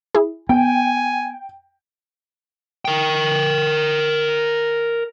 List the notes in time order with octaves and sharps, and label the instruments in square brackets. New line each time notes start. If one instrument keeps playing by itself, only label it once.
[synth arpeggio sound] E4 G#4
[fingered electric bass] B3 [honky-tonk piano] G5 [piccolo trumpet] G#5
[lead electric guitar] A#4 G5